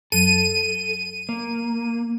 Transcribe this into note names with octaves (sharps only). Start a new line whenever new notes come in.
F#2 F#3 A4 D#7
A#3